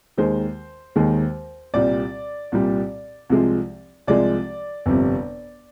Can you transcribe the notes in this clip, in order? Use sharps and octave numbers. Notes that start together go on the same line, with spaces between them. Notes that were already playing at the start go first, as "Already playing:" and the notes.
D#2 D#3 G#3 C5
D#2 D#3 G#3
C2 A#2 G3 D5
C2 A#2 G3
C2 C3 F3 G#3
C2 C3 F3 G#3 D5
G1 F2 C3 G3